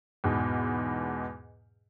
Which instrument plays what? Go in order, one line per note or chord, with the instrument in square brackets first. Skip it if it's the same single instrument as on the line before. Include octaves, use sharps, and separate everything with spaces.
[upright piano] E2 G#2 B2